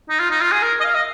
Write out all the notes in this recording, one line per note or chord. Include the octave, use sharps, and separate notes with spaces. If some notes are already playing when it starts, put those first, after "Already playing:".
D#4
F4
D#4
F4
G#4
A#4
D#5
F5
D#5